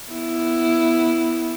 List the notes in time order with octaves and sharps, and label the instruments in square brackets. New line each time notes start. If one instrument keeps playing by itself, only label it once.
[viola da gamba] B3 E4